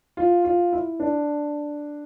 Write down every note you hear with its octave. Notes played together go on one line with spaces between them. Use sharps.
F4
F4
E4
D4